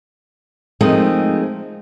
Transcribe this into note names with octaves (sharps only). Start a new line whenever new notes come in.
F3 G#3 A3 C4 D#4 A#4